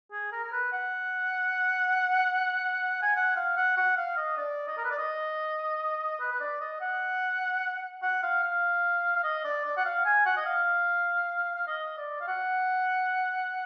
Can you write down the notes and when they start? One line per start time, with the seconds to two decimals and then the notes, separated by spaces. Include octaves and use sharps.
0.12 G#4
0.32 A#4
0.45 A#4
0.52 B4
0.73 F#5
3.02 G#5
3.16 F#5
3.36 F5
3.57 F#5
3.77 F#5
3.97 F5
4.17 D#5
4.37 D5
4.68 D#5
4.78 A#4
4.84 B4
4.91 D5
4.98 D#5
6.20 B4
6.32 B4
6.40 D5
6.61 D#5
6.81 F#5
8.03 F#5
8.23 F5
8.43 F5
9.16 F5
9.24 D#5
9.45 D5
9.65 D5
9.77 F#5
9.85 F5
10.06 G#5
10.26 F#5
10.37 D#5
10.46 F5
11.56 F5
11.68 D#5
11.98 D5
12.21 F5
12.28 F#5